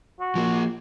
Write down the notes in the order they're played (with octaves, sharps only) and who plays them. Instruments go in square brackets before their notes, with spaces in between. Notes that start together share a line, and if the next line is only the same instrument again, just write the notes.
[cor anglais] F#4
[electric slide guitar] F3 A#3